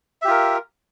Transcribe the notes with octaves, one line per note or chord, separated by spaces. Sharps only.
F4 G4 A#4 E5